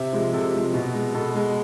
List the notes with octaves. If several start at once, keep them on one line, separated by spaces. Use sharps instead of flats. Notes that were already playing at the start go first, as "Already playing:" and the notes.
Already playing: C3 E5
F3 G#3
C3 A4
F3 G#3
B2
G#3
B2 A4
G#3